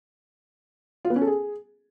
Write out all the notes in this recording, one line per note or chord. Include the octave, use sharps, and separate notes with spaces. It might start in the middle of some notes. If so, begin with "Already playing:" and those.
F4
B3
C#4
A4
G#4